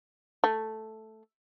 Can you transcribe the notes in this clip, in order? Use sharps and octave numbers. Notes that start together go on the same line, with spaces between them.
A3